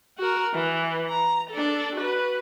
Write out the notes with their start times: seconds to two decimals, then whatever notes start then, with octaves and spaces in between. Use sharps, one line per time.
0.18 F#4 A#4
0.55 E3
1.09 A#5
1.51 D4 A4
1.96 F#4 B4